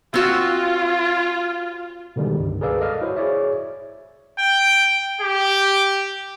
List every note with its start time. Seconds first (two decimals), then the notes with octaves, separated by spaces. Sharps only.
0.14 C4 F4 F#4 E5
2.16 B2 D3 D#3 G3 G#3
2.40 C#2 G2
2.61 G#4 A#4 B4 D5 F5 E6
2.79 A4 D5 D#5 F5 F6
3.01 E4 F#4 C5 C#5
3.16 G#4 C#5 D5 E5
4.39 G5
5.21 G4